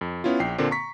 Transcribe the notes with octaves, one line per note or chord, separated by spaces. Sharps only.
F2
B3 C#4 E4 F4
A#1 G5 C7
A#2 D3 A#3 C4
A#5 C#6 B6